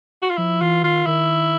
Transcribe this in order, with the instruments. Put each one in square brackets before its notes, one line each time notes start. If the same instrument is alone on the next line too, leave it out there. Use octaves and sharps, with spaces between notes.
[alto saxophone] F#4
F4
[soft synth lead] F3 [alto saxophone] E4
[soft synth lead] E3 [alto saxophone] F4
[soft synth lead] D#3 [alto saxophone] F4
[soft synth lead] D#3 [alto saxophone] E4